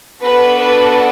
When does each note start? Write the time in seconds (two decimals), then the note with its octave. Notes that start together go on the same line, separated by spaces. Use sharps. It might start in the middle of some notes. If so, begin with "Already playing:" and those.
0.23 B3 D4 F#4 A4 B4
0.60 B4